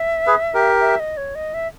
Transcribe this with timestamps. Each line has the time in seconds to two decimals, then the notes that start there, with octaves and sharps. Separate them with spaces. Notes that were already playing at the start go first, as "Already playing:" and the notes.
Already playing: E5
0.27 G#4 B4
0.54 G4 A#4
0.81 E5
1.00 D#5
1.17 C#5
1.35 D#5
1.54 E5